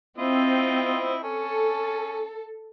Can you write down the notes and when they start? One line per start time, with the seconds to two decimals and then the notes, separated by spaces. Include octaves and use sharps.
0.18 C4 E4 F4 D#5
1.23 C#4 A4